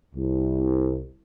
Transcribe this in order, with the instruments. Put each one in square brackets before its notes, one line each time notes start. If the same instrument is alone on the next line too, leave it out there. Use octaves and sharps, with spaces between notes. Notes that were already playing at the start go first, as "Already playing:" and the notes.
[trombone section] C2